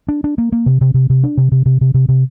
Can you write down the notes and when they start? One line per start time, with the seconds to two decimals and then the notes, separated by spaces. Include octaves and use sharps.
0.08 D4
0.24 D4
0.38 A#3
0.52 A#3
0.66 C3
0.81 C3
0.94 C3
1.10 C3
1.24 D4
1.37 C3
1.52 C3
1.66 C3
1.81 C3
1.94 C3
2.09 C3